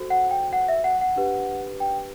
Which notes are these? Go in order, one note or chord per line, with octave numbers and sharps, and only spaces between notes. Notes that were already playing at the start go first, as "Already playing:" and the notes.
Already playing: F#4 A4 C5
F#5
G5
F#5
E5
F#5
F#5
D4 G4 B4
G5